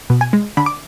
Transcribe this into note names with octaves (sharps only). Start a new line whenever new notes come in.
B2
G#5
G#3
D3 B5
D6